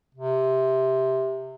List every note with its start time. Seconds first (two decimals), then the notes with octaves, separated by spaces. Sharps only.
0.14 C3